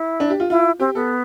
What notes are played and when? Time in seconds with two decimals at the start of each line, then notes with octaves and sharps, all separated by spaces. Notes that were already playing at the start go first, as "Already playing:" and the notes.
Already playing: E4
0.20 D4
0.30 G4
0.40 F4
0.50 E4 F4
0.80 C4 G4
0.95 B3 A4